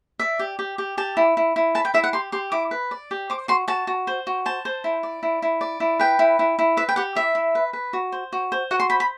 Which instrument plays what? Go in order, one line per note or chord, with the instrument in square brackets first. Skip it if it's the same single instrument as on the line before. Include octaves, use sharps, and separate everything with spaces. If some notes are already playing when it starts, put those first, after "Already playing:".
[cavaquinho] D5 E5
G4
G4
G4
G4 A5
E4
E4
E4
B4 A5
G5
E4 E5
F#5
G4 C6
G4 C6
E4 D6
B4
D5
G4
C5 D6
F#4 C6
F#4 A5
F#4
C5
F#4
C5 A5
C5
E4
D5
E4
E4
D5
E4
B4 G5
E4
E4
E4
B4 E5
G5
G4 F#5
E4 E5
E4
B4
B4
F#4
C5
F#4
C5
F#4 F#5
C6
C5 B5
B5